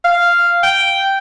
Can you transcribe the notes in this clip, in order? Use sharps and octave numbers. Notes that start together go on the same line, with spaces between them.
F5
G5